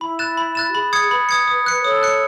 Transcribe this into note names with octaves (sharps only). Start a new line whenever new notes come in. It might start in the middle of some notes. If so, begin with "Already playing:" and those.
E4 B5
F#6 A6 E7
B5
F#6 A6 E7
F#4
G#4 B5
D#6 G#6 C#7
B4 B5
D#6 G#6 C#7
D#6
F#6 C#7
A4 C#5 D#6
F#6 C#7